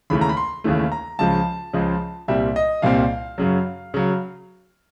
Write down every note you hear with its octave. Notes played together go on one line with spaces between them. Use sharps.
D#2 C#3 E3 A3 B5
A#5
B5
C6
D#2 C#3 E3 A3
A#5
C#2 C#3 F3 G#3 A5
C#2 C#3 F3 G#3
C2 A#2 G3 C4 E5
D#5
C2 A#2 G3 C4 F5
F#2 C#3 F#3
C#3 F#3